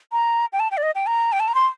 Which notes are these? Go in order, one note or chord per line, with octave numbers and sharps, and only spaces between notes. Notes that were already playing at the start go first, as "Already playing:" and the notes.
A#5
G5
A5
G5
D5
D#5
G5
A#5
G5
A5
A#5
C6